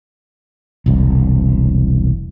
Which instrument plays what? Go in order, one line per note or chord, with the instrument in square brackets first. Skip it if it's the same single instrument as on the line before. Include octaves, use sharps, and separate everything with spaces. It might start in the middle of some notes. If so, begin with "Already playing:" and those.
[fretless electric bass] E1 C2